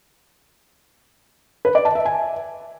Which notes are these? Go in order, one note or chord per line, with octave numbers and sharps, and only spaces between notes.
B4
D5
A5
E5
G#5